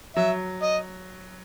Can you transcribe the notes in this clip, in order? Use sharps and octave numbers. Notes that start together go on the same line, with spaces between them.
F#3 E5
D#5